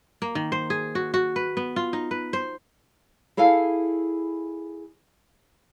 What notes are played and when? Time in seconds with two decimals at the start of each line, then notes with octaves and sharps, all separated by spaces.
0.22 A#3
0.35 D#3
0.52 C5
0.70 G#4
0.95 F#4
1.14 F#4
1.36 B4
1.57 B3
1.76 F4
1.93 D#4
2.11 B4
2.33 C5
3.37 E4 G#4 A4 F5 G#5